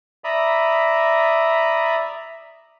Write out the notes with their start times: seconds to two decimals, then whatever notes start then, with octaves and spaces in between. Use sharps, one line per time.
0.24 D5 E5 A#5 B5 D#6